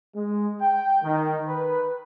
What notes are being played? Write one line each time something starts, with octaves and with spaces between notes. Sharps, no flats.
G#3
G5
D#3
B4